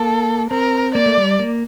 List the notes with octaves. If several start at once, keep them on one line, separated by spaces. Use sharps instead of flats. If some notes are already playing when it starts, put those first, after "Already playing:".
Already playing: A#3 A4
C4 A#4
A#3 D5
A3
G3
A#3